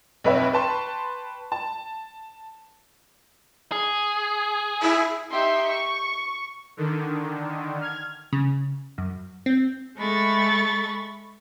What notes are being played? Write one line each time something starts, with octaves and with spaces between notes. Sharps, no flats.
B1 F2 B4 C#5 E5
B4 G5 A5 C6 C#6
A5
G#4
E4
D#4 G4 E5 C6
C#6
D3 D#3
F6 G#6
C#3
F#2
C4
G#3 A3 B5 C#6 A6